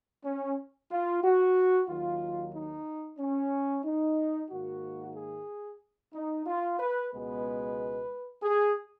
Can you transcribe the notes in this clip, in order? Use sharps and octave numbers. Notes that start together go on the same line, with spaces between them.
C#4
F4
F#4
D#2 D#3 F#3 F4
D#4
C#4
D#4
G#2 D#3 A#3 F#4
G#4
D#4
F4
B4
C#2 B2 G#3 B3 B4
G#4